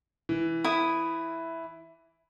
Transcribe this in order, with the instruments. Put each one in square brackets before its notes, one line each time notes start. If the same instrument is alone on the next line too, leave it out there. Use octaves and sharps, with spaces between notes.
[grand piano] E3
[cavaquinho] E4 D#6